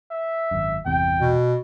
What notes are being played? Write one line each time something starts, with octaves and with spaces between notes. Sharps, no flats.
E5
G#1 F#2
G1 E2 C3 G5
B2